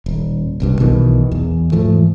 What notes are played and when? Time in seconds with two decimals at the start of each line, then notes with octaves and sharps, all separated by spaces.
0.06 D#1
0.60 F#1 C2 G2
0.79 B1 B2 D#3 E3
1.32 E2
1.72 G#2 E3 F3 A3